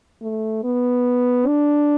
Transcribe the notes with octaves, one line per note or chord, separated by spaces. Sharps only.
A3
B3
D4